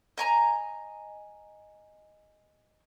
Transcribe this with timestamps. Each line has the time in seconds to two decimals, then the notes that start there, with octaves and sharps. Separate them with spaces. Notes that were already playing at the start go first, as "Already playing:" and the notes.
0.18 D#5 G#5 A#5